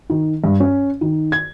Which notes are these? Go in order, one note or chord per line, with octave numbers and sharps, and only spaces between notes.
D#3
G2
C#4
D#3
G#6